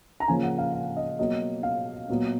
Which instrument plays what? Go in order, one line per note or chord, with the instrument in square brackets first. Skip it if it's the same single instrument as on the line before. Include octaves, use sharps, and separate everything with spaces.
[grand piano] A#5
C#3 F3 A#3 C#4 G#5
F#5
F5
F5
D#5
B2 F#3 A#3 D#5
F5
A#2 F#3 B3